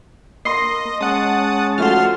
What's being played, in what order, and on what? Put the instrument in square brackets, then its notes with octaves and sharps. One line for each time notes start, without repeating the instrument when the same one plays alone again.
[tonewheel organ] A#3 [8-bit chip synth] D#5 [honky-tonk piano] C6 C7
[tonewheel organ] G#3 C#4 A5 [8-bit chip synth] F#5 D#6
[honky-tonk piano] F3 A3 F#4 [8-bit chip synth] C6 F6